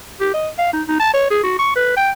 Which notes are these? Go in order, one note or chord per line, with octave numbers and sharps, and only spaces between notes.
G4
D#5
F5
D#4
D#4
A5
C#5
G#4
F#4
C#6
B4
G5